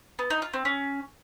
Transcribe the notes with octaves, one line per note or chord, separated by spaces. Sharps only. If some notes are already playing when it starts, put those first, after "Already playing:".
B3
D#4
F4
C4
C#4